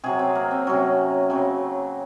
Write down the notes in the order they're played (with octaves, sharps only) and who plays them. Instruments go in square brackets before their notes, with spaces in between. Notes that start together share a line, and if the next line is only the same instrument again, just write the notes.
[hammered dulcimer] C3 F#3 G#4
C4
A#3
C4
C3 F#3 C#4
C#3 F#3 C4